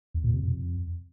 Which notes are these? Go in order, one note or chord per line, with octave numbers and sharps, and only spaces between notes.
E2
A#2
C3
F2